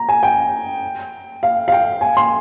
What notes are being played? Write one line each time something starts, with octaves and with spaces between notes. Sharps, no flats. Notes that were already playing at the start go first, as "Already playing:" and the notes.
Already playing: A#5
G#5
G5
F5
F5
G5
G#5
C6